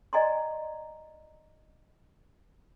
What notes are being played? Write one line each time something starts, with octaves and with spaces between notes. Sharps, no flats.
D5 D#5 G#5 A#5 C6